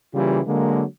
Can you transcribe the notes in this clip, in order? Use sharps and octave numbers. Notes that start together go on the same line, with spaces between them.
C#3 E3 G3 A#3 F4 G4
D3 F#3 G#3 A#3